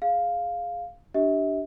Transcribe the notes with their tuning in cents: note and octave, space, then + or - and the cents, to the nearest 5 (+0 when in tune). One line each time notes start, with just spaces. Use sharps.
G#4 +0 F5 +0
D4 +0 G4 -20 E5 -40